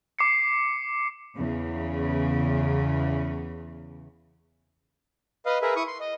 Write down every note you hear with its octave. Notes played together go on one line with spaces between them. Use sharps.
D6 C7 C#7
E2 C#3
B4 D#5 F5
G#4 A#4 B4 E5
E4 C#6 D#6
C6
D#5